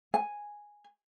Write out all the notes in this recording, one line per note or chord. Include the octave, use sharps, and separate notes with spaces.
G#5